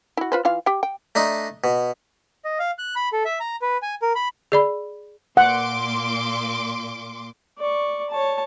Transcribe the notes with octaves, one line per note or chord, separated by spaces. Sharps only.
E4 F#4
F4 B4 C5
E3 F4 F5
G4 G5
G5
A3 D4 D#4
B2
D#5
F5
F#6
B5
A4
E5
A#5
B4
G#5
A#4
B5
G#4 D5 B5
A#2 F#5 C6 D6
D5 C#6
C#5 A5